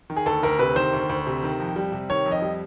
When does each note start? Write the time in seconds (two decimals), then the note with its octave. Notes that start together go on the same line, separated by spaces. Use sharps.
0.10 D#3
0.16 G#4
0.26 D2 A4
0.43 D2 A#4
0.59 C3 B4
0.76 D#3 C5
0.93 D2
1.09 D2
1.27 C3
1.43 D#3
1.60 F2
1.76 G3
1.92 C3
2.09 D#3 C#5
2.26 F2
2.31 D#5
2.42 G3